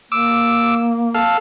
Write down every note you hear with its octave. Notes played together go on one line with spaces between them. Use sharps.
A#3 D6 E6
A4 F5